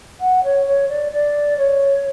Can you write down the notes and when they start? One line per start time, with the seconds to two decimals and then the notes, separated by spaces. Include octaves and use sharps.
0.20 F#5
0.43 C#5
0.66 C#5
0.88 D5
1.12 D5
1.57 C#5